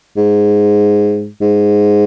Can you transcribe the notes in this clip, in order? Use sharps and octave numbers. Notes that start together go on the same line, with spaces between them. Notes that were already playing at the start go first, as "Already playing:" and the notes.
G#2
G#2